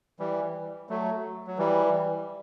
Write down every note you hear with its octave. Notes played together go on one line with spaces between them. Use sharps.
E3 G3
F#3 A3
F#3
E3 G3